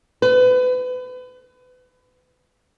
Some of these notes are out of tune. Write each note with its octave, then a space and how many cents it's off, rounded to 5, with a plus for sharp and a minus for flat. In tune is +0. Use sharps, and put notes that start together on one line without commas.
B4 +30